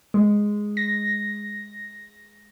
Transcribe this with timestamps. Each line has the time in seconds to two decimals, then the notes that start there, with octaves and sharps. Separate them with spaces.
0.14 G#3
0.77 A#6